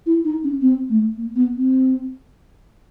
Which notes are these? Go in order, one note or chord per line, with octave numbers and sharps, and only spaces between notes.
E4
D#4
C#4
C4
A3
A#3
B3
C4